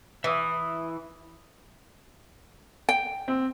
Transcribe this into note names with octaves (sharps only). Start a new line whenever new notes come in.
E3 E5 D#6
G5
C4